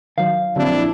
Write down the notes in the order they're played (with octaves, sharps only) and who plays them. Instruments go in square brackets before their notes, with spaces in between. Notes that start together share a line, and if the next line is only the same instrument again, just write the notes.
[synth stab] D#3 F#3 [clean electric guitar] F5
[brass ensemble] A#1 E4 [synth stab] D3 F#3 C4 [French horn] D4